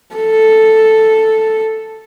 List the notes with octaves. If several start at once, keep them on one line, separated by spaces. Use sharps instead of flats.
A4